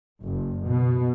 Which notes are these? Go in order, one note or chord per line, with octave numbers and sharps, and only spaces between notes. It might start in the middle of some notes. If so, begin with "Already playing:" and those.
F#1
B2